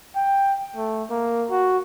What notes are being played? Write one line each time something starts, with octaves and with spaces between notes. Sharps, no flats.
G5
A3
A#3
F#4